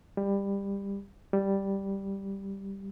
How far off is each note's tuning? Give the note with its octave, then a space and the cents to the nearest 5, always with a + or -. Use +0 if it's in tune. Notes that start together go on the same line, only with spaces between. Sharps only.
G3 +20
G3 +0